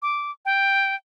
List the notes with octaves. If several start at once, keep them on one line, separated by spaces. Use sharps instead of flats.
D6
G5